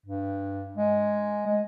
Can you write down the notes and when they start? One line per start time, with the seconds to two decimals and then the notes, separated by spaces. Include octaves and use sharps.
0.06 G2
0.77 G#3
1.46 G#3